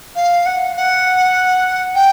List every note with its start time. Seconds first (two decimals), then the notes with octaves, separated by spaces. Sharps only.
0.15 F5
0.46 F#5
0.76 F#5
1.95 G5